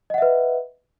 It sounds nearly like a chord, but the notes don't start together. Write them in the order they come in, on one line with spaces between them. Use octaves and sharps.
D#5 F#5 E5 B4